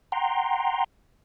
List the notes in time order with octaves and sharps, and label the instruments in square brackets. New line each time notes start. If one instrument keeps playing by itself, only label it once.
[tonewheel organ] F#5 G5 A#5 C6